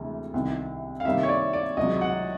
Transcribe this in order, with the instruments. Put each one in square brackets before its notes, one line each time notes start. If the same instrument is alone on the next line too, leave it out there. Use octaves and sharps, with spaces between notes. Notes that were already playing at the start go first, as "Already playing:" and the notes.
Already playing: [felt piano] D2 C3 E3 G#3
C2 C3 D#3
[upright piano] F5
[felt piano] C3 D#3 G3 A#3 D#4 [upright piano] E5
[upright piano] C#5
D5
D5
[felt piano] C#2 C3 D#3 F#3 [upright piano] D#5
[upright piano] F#5